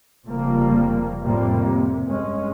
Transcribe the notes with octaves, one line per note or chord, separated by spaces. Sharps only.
F1 C#3 F3 G3 A#3
F2 A2 C3 G3 A#3
C3
G2 G#3 C#4